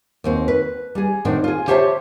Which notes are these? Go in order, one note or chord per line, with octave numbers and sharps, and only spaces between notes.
D#2 C4 F#4
B4
G3 G#4
A2 D#3 C4 D4 F#4
F4 G#4
G4 C5 C#5 E5 G5 A5